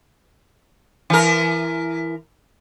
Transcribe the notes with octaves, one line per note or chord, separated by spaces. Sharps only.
E3 A#4